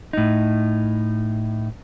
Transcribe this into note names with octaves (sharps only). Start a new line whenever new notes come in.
A2 D#4